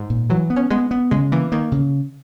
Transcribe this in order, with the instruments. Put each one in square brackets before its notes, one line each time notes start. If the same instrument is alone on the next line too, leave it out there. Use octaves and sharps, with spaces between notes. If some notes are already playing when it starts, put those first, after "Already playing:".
Already playing: [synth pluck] G#2
[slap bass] A#2
[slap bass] E3 [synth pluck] F#3
[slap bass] B3
[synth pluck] C#4
[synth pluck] G#3 [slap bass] B3
[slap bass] B3
[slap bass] C#3 [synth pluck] G#3
[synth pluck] E3 [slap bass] A#3
[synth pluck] D#3 [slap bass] A#3
[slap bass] C#3